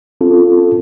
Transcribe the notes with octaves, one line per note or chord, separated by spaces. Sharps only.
C4 C#4 F4 A4